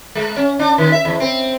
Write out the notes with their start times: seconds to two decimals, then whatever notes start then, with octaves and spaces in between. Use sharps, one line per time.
0.15 G#3
0.36 C#4
0.59 D4
0.78 D#3
0.92 E5
1.05 E2
1.20 C4